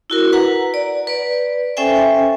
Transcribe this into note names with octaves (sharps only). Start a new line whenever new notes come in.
E4 F#4 A#4
B4 F#5 A#5
D5
B4 D5
C#4 A4 C5 E5 G5 G#5